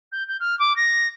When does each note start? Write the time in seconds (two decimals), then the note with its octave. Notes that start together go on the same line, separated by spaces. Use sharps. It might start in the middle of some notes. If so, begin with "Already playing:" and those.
0.12 G6
0.28 G6
0.40 F6
0.59 D6
0.76 A#6